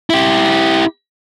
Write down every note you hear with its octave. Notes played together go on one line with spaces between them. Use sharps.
E4 G4